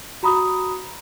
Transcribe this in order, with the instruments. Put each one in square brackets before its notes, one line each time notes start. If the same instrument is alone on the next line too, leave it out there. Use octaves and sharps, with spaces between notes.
[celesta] F#4 A#5 B5 D#6